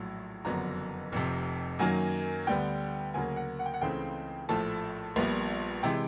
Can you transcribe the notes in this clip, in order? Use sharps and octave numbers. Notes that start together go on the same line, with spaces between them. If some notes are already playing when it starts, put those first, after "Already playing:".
Already playing: A#1 A2 F#3
F#1 F2 D3 F#3 B3 A#5
F1 F2 C3
F#2 D#3 F#3 A#3 G#5
D2 D3 G3 B3 G5
D2 C#3 F#3 A#3 G#5
F#5
F#5
G5
F#5
C#2 C#3 E3 A3 C4 G5
A#1 A2 F3 A3 A5
A#1 A#2 G3 B3
C3 E3 G#3 G5